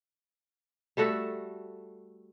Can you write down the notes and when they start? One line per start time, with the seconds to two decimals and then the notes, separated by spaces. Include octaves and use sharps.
0.97 G3 A3 F#4 A4